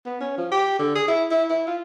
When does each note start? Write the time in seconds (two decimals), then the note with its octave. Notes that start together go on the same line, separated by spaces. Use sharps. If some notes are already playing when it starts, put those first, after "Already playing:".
0.06 B3
0.21 C#4
0.38 F3
0.52 G4
0.79 D3
0.96 G#4
1.08 E4
1.31 E4
1.50 E4
1.67 F4